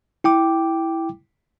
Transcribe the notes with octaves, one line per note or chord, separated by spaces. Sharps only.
E4 G5 D6